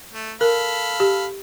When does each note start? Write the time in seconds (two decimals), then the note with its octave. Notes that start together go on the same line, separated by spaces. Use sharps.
0.13 A3
0.41 A4 A#4 F5 B5
1.00 G4